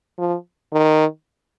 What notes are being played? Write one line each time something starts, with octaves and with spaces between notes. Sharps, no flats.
F3
D#3